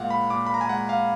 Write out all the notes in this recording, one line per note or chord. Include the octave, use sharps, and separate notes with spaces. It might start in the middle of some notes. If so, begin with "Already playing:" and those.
Already playing: A#2 G#3 F5 F#5
B5
A#2 D6
B5
A#5
G#5
G#3 F#5
F5